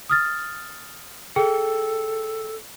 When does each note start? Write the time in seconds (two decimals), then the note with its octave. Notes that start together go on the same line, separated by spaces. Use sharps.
0.10 D#6 F6 A6
1.36 G#4 A4 G5